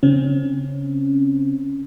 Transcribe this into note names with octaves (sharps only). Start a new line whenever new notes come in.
C#3 C4 C#4